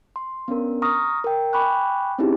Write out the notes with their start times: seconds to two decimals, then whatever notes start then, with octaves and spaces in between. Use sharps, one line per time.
0.16 C6
0.48 B3 C#4 D4 A#4
0.82 A#5 C#6 D#6 F6 A#6
1.24 A#4 G5
1.53 G5 G#5 B5 C#6 D6 F#6
2.19 C4 C#4 D#4 E4 G4 G#4